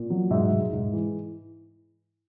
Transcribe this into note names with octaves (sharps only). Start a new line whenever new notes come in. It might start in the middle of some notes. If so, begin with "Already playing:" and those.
Already playing: A#2
F#3
G#2 E5
G#2
G#2
E3